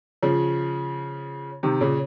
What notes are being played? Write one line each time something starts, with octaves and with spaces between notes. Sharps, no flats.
C#3 F3
C3 D#3
A#2 C#3